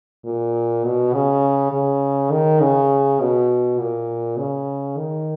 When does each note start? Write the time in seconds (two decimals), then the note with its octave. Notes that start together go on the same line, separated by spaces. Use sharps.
0.25 A#2
0.84 B2
1.13 C#3
1.72 C#3
2.31 D#3
2.60 C#3
3.20 B2
3.79 A#2
4.38 C#3
4.97 D#3